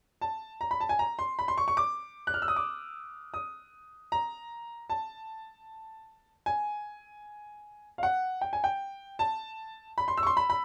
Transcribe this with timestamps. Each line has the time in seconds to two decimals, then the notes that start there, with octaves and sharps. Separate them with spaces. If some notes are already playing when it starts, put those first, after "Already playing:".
0.21 A5
0.61 A#5
0.71 B5
0.80 A5
0.89 G#5
0.99 A#5
1.19 C6
1.39 B5
1.48 C6
1.58 C#6
1.68 C#6
1.77 D6
2.27 F#6
2.34 F6
2.42 E6
2.48 D#6
2.56 D6
3.34 D#6
4.12 A#5
4.90 A5
6.46 G#5
7.98 F5
8.03 F#5
8.41 G5
8.53 G#5
8.64 G5
9.19 A5
9.98 B5
10.08 C6
10.17 E6
10.23 C#6
10.27 C6
10.37 B5
10.50 B5